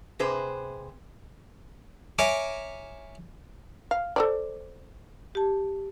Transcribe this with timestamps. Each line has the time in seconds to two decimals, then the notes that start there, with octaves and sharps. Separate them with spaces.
0.19 C3 G#4 B4 C5
2.19 A#4 C#5 E5 G#5 D6
3.91 F5
4.16 A4 C5 D5
5.35 G4 A5